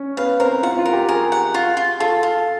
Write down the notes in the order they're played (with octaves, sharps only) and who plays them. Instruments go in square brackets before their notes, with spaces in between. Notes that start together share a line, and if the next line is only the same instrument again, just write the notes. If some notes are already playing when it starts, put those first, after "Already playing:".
Already playing: [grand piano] C#4 C#5
[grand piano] B3 B4 [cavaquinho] F5
[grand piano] C4 C5 [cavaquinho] A#4
[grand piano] F4 F5 [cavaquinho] F#5
[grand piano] F4 F5
[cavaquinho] A#4
[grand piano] G4 G5
[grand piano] G#4 G#5 [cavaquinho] A#4
[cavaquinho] F#5
F4
F4
[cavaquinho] F4 [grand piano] A4 A5
[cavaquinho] F4